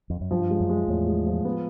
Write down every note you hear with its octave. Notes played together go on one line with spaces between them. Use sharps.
F2
F#2
G2 F3
G#3
F#2
G#3
E2 A2
G#3
F3
B3